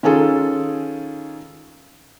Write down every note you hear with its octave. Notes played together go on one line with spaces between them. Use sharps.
D#3 C#4 F4 G#4 A4